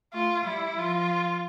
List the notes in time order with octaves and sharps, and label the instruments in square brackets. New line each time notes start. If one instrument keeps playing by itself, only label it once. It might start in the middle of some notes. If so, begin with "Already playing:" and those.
[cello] A3 [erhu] F4
[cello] G3 [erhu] E4
[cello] F3 [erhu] F4